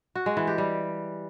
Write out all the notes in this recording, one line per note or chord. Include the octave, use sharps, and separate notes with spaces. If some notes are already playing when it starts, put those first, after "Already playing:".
F#4
G#3
E3
G4
G3